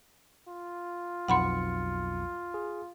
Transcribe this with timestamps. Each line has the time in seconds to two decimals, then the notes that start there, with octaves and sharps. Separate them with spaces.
0.48 F4
1.28 B1 F2 F#5 B5 C6 C#7
2.54 G#4